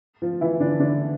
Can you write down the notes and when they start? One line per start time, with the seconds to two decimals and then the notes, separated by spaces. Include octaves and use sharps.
0.22 F3 F4
0.41 E3 E4
0.60 D3 D4
0.80 D3 D4